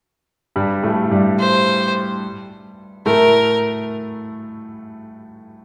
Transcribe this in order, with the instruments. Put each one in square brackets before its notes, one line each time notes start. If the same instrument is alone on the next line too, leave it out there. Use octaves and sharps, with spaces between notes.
[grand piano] G2 G3
A2 A3
G2 G3
[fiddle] C5
[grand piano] A2 A3 [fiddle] A#4